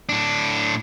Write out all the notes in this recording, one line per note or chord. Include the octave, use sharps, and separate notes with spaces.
A2 D4